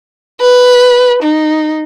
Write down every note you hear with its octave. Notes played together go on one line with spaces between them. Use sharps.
B4
D#4